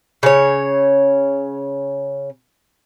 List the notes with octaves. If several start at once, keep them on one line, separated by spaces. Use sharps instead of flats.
C#3 C#5